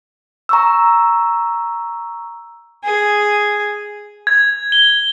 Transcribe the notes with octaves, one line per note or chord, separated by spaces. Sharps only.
A#5 C#6 E6
G#4
G#6
G7